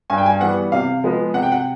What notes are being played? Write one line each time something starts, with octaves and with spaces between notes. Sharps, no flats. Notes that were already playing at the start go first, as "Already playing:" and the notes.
G2 G#5
G5
G#5
E3 G3 B3 F#5
C3 F5
F3 G#3 B3
C3 F#5
G5
F#5